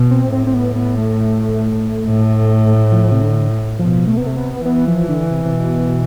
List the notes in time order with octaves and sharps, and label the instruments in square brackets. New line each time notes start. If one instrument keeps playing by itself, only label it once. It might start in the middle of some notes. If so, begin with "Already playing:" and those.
Already playing: [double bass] B2
[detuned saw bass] C4
[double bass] A2 [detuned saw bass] C4
[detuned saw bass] C4
B3
B3
A3
[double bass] A2
[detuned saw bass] F3
C3
D3
[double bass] B2 [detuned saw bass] F3
[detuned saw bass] A3
B3
[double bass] C3 [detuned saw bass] A3
[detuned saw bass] B3
[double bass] E3 [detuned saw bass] B3
[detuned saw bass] F3
D3
C3
C3
B2